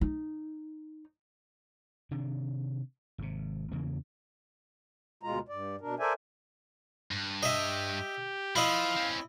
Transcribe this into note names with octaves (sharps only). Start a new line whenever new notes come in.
D#4
C3 D#3 D4
G#1 C3
E2 C#3 E3 A#3
D2 B2 G#3 F4 A#5
G2 D5
B2 D4 A#4
A4 A#4 C5 D5 E5 G#5
G2
G4 D#5 E5
F3 E4 D#5 F5
C4 C#4